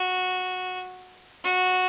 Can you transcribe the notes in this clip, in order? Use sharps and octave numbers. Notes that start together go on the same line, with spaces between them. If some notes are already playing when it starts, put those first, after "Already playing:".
Already playing: F#4
F#4